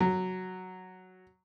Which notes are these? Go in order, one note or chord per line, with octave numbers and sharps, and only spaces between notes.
F#3